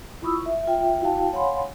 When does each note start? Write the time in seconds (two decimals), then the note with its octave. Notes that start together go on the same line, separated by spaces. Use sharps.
0.22 E4 F4 B5 C#6 D#6 E6
0.46 E5
0.67 F4 E5 G5
1.01 E4 F#4 F5 G5 A5
1.33 C#5 F5 F#5 G#5 B5 C6